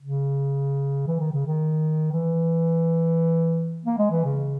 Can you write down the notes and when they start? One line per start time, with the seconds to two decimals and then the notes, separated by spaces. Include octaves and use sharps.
0.01 C#3
1.07 E3
1.20 D#3
1.33 C#3
1.46 D#3
2.12 E3
3.85 A#3
3.98 G#3
4.11 E3
4.25 C#3